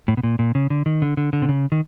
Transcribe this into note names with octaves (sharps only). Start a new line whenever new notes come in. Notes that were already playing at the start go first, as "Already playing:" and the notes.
A2
B2
A#2
A#2
C#3
D3
D#3
D3
D3
D3
C3
C#3
D#3